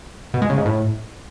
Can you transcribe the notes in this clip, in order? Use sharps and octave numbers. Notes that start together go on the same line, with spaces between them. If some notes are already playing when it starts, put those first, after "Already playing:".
B2
G#3
C#3
G#2
A2